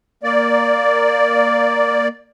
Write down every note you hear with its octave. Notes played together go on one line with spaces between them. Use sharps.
A#3 D5